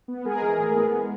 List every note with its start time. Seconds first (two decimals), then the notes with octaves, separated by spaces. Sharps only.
0.08 B3
0.25 G#3 G#4 A#4
0.42 E3
0.58 A2
0.75 B3
0.92 G#3